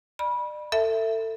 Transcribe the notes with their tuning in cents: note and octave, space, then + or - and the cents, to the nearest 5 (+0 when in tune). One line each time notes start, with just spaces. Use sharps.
D5 +40 B5 -20
A4 +30 E5 +0 A5 -5